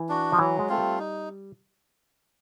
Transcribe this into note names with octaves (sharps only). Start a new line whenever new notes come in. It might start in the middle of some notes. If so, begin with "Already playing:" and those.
Already playing: E3
D4 F#4
F3
E3 F#3
G#3
A3 C4 F4
G3
D#4